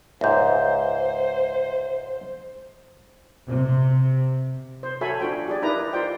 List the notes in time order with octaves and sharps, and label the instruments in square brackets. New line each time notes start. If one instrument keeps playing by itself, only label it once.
[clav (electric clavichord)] C#2 G#2 [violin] C5 [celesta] E5 G6
[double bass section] C3
[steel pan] C5
F#4 A4 C#5 E5 G#5 B5
D4 F4 F#4 C5 G5
G4 G#4 D5
D#4 E4 A#4 B4 D5 A#5
F4 C5 D5 G5